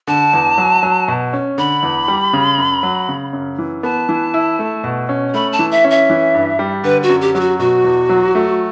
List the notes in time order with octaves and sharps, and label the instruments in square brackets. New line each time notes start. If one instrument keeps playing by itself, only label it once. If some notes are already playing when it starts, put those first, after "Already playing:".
[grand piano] D3 [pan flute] A5
[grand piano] E2
F#3
F#3
B2
C#4
[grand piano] D3 [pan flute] B5
[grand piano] E2
G3
C#3
F#2
F#3
C#3
F#2
E3
[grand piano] B3 [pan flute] A5
[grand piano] E3
E4
A3
B2
C#4
[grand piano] A3 [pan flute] B5
[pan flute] A5
[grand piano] E3
[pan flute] E5
[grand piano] C#4
[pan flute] E5
[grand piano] E3
G2
G3
[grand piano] D3 [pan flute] B4
[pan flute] F#4
[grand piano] F#2
[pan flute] G4
[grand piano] F#3 [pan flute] G4
[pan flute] F#4
[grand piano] B2 [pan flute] F#4
[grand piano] E2
F#3
A3